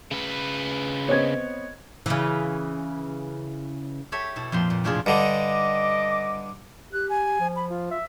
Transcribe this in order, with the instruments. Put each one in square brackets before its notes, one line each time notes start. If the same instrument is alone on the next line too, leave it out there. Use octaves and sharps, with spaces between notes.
[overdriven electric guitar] C#3 B4
[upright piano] B3 C4 D#5 [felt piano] C#5 G#6
[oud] C#3 E3
[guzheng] G4 A4 C#5 E5
B2 E4 A5
F2 A#2 G5 C6
A#2
A2 C3 F3 D4 F4 G#4
[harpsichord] G2 D3 [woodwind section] D#5 D6
[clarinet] G4 [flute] F#6
[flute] G#5
[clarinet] F3
[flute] B5
F4
[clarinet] E5